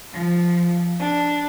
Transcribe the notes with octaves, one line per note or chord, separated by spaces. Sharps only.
F3
D4